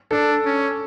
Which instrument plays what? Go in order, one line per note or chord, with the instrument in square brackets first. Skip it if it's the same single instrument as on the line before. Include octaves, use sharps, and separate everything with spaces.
[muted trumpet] D4 [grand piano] A4
[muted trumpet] C#4